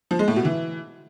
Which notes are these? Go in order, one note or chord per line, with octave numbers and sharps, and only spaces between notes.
F3
G#3
A2
B2
E3